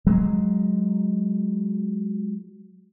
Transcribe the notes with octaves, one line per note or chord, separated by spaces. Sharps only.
F#3 G#3